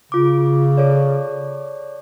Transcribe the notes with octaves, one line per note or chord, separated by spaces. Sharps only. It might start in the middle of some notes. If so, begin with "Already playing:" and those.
C#3 F4 D6
A4 C#5 D5